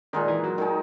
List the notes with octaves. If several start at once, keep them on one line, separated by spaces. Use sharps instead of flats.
A#2 D#3 G#3 D#4
E3
F#3
D#3 G#3 D#4